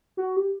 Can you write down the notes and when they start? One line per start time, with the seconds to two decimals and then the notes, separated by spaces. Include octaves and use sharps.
0.17 F#4
0.36 G4